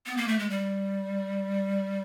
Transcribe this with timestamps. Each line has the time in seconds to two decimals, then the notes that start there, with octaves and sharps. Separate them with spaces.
0.06 B3
0.17 A#3
0.28 A3
0.39 G#3
0.50 G3